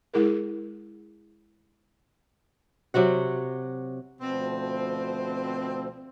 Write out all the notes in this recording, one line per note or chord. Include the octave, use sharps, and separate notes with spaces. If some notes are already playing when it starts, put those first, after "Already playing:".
G#3 E4 G#4 A#4
C3 F#3 F#4 F#5
D2 B2 F3 C4